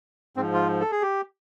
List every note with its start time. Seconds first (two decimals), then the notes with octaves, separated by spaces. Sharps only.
0.37 G#2 F3 C4
0.53 F4
0.80 A4
0.91 G#4
1.02 G4